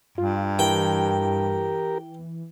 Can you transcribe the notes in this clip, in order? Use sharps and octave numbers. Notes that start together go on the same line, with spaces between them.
G2 F4
E3 G4 A#4 G5